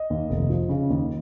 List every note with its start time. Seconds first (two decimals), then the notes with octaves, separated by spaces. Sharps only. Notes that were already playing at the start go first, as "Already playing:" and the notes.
Already playing: D#5
0.10 D#2
0.30 F1
0.50 F3
0.69 C#3
0.90 D#2